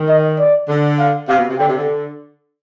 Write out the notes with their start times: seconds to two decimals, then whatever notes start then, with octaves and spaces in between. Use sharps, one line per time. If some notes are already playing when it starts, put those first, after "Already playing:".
Already playing: D#3
0.09 D#5
0.39 D5
0.69 D3
0.99 F5
1.28 C3 F5
1.38 B2
1.49 C3
1.59 D3 G5
1.68 C3
1.77 D3